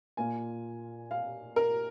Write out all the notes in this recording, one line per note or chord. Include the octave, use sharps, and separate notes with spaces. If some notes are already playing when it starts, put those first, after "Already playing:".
A#2 A#3 F4 G#5
F5
A#4